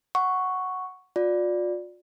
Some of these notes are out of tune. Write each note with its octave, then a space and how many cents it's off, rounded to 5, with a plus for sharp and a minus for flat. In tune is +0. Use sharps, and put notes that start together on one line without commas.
F#5 +0 C#6 +0
F4 +45 D5 +0